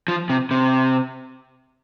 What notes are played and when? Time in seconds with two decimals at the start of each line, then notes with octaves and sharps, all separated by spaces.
0.08 F3
0.30 C3
0.51 C3